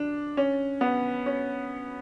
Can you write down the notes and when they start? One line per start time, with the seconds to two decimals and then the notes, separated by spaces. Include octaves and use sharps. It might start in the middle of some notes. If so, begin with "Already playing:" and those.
Already playing: D4
0.37 C#4
0.81 B3
1.26 C#4